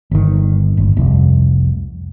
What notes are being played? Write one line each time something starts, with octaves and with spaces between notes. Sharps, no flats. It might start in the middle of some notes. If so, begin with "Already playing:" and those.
G1 D#3
G1
F1 C2